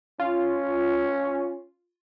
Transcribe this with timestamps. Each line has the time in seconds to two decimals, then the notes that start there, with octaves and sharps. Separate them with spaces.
0.20 C#4 F4